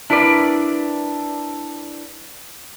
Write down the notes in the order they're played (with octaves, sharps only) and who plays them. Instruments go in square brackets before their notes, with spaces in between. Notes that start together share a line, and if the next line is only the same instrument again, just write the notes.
[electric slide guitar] D4 E4 A#4 B4 D5